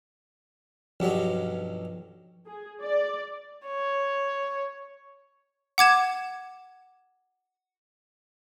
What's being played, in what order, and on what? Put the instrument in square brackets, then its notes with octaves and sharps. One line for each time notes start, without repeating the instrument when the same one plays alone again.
[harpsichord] B1 G2 F#3 [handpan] F3
[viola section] G#4
D5
[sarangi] C#5
[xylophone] F#5 D6 G#6 E7